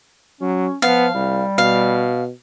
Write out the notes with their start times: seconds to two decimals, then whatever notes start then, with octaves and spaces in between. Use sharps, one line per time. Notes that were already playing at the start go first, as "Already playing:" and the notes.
0.41 F#3 C#4
0.82 F3 B3 F5
1.15 C2 G3
1.58 B2 F5